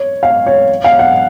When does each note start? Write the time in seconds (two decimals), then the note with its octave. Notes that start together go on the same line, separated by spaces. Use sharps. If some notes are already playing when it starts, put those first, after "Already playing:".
Already playing: C#5
0.23 F5
0.46 C#5
0.84 F5
0.99 F#5